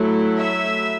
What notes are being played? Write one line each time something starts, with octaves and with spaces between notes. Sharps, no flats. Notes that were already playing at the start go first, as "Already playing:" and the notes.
Already playing: F#3 A3 E4
E5